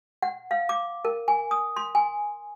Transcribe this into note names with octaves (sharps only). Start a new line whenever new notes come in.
F#5
F5
D6
A#4
G#5
D#6
C6
G#5